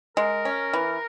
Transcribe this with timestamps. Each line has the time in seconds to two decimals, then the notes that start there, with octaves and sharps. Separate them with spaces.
0.17 G#3 A#4
0.45 C#4
0.73 E3